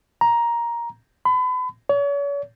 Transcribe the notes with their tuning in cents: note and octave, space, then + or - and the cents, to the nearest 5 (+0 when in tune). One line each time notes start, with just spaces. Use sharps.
A#5 +10
B5 +35
C#5 +40